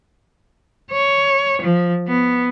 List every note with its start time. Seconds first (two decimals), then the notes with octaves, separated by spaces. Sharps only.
0.91 C#5
1.62 F3
2.08 B3